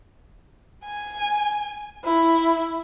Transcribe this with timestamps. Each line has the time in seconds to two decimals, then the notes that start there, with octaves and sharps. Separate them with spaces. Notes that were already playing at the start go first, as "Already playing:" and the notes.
0.86 G#5
2.05 E4